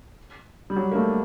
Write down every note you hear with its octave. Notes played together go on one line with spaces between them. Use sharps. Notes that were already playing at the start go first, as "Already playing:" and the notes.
G3
F#3
A#3
A3